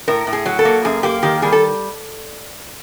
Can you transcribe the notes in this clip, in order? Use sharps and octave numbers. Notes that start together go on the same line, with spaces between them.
A2 A#4
A2
G#4
F#3
A4
A#3
F#2 G#4
A#3 G4
D#3 G4
G3 G#4
A4